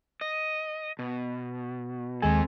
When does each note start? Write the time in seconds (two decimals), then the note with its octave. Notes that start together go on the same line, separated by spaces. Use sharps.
0.21 D#5
0.99 B2
2.22 D#2 G#3 C4 A4 G#5